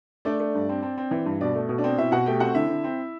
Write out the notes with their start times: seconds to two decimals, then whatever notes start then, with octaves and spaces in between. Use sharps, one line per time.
0.25 A3 D4 D5
0.40 A3
0.55 G2
0.69 C4
0.83 C4
0.98 C4
1.11 E3
1.26 G2
1.40 B2 D4 D5
1.55 A3
1.69 B2
1.78 D4 D5
1.84 C4
1.98 B2 E4 E5
2.12 B2 F#4 F#5
2.26 A3 G4 G5
2.40 C4 F#4 F#5
2.55 D3 E4 E5
2.69 D3
2.84 C4